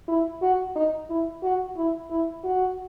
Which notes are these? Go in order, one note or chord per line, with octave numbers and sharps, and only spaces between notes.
E4
F#4
D#4
E4
F#4
E4
E4
F#4